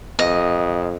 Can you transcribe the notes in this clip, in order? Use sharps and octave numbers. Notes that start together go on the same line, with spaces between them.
F2 D#5